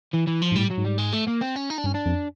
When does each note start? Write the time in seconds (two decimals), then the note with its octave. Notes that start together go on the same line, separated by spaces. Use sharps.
0.14 E3
0.27 E3
0.42 F3
0.52 G#2
0.56 A2 G3
0.71 F#3
0.78 G#2
0.85 G3
0.99 G#3
1.13 A3
1.28 A#3
1.42 C4
1.56 C#4
1.70 D#4
1.78 D4
1.84 G2 C#4
1.94 D4
2.06 F2